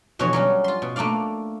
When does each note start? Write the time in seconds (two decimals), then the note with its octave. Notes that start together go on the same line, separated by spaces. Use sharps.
0.19 F2 B2 D3 E3 F#4 C#5
0.33 F#3 G3 C#4
0.64 F4 C6
0.82 B2
0.96 A3 A#3 D4 D5 F5